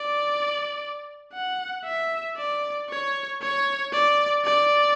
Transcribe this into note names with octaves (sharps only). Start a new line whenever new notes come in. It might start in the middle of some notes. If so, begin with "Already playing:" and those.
Already playing: D5
F#5
E5
D5
C#5
C#5
D5
D5